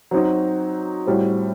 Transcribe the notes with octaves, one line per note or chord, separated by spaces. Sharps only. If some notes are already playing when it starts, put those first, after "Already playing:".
F#3 C4 D#4 F#4
A2 G3 C4 F#4